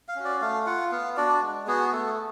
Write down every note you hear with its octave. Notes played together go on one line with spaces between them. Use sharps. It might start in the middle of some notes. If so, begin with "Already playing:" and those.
F5
C#4 F#4
D5
A3 F5
F4 F#5
B3 F5
D4 F#4 D5
G#3
B3 F#4 G#4
A3 A4